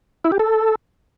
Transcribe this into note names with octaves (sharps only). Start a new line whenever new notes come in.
E4
G4
A4